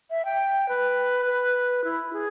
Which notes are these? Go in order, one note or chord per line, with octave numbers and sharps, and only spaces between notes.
E5
G5
B4
B4
E4
G#4